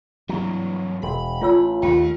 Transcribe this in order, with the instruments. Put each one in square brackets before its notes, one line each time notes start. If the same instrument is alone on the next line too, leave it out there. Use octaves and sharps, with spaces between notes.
[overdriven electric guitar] G2 E3 [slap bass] F#3
[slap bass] E1 [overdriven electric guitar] B5
[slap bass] A1 A3 [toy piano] F4 C#5 E6
[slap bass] D#2 A3 [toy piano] F4 G5 [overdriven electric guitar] A#4 B5